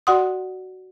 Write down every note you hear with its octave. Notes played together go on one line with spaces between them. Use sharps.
F#4 D5 F#5 C6 D#6